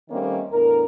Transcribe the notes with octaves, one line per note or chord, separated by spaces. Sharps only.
D#3 G3 A3 A#3 C4 C#4
E2 A2 D4 A#4